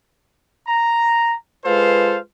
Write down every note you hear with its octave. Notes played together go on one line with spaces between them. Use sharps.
A#5
G#3 F4 A4 B4 C5 F5